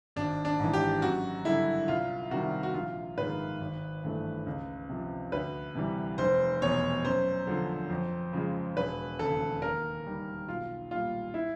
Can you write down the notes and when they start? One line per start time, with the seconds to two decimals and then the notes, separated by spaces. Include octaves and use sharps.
0.16 G#1 D4
0.45 D4
0.59 G#2 E3
0.73 G4
1.02 F#2 F#4
1.45 D3 G3 E4
1.88 C2 F4
2.31 C3 D#3 G3 F#4
2.63 F#4
2.74 A#1 F4
3.18 G#2 D#3 G#3 B4
3.61 G#1
4.03 G2 E3 A3
4.46 C#2
4.89 C3 F3
5.32 D2 B4
5.75 C3 E3 G3
6.18 F1 C5
6.61 E2 B2 C#5
7.04 F#2 C5
7.47 D3 F3
7.90 F2
8.33 C#3 F3 G#3
8.77 E1 B4
9.19 D#2 C#3 A4
9.62 D#2 A#4
10.06 D#3 G3
10.48 B1 F4
10.91 A#2 G3 F4
11.34 E4